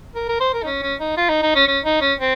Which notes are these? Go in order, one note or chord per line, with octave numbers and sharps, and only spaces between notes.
A#4
A#4
C5
A#4
D#4
C#4
C#4
D#4
F4
D#4
D#4
C#4
C#4
D#4
C#4
C4